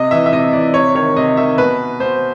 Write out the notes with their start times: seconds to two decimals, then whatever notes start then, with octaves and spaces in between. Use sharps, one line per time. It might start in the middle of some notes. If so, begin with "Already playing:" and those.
Already playing: C3 D#5
0.11 E3 E5
0.26 E5
0.33 C3 D#5
0.53 E3 D5
0.74 C3 C#5
0.95 D#3 C#5
1.16 C3 D#5
1.37 D#3 E5
1.58 B2 B4
2.00 B2 C5